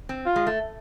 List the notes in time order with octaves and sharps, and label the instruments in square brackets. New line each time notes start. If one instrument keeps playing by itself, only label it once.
[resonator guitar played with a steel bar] C4
[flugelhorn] F4
[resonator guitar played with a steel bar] G#3
A3